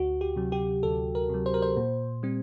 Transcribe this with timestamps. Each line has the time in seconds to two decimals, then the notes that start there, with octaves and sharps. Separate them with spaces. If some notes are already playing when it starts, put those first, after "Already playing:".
Already playing: D2 F#4
0.21 G4
0.36 C3 F#3
0.52 G4
0.83 D2 A4
1.15 A#4
1.30 C3 F#3
1.46 C5
1.54 A#4
1.62 C5
1.77 A#2
2.23 G3 C4